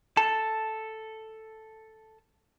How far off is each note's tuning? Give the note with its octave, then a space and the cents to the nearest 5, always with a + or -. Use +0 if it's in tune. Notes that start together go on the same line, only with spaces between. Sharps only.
A4 +0 A5 +0